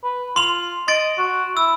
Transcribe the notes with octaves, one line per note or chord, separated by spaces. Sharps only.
B4
F4 C6 F7
D#5 C6 A6 D7
F#4
E4 E6